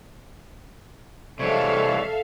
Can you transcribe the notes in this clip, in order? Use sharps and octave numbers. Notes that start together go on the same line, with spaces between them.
C3 E3 G#3 A4 C#5 D5 E5 F5